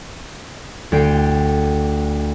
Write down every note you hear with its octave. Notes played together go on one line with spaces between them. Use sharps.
D2 G5 C7